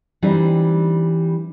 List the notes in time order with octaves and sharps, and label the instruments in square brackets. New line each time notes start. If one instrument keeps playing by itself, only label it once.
[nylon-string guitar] E3 G3 C4 D4 D#4